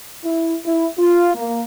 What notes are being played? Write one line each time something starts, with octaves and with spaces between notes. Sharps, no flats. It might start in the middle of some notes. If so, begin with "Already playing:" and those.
E4
E4
F4
A#3